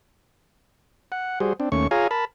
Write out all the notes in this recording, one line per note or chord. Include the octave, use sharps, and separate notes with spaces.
F#5
G3 F#4 G#4 C5
C4 D4
D#2 A3 C#4 C#6
F4 G#4 C#5 F5 G#5 A#5
A#4 A5 B5